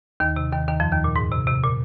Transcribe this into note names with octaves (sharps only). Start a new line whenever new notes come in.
D#2 D#3
C3
D#2 D#3
D#2 D#3
F2 F3
D#2 D#3
A#2
G#2
C3
C3
A#2